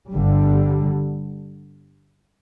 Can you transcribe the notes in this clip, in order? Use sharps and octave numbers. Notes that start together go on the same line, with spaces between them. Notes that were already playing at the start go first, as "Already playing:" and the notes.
G1 G2 D3 G3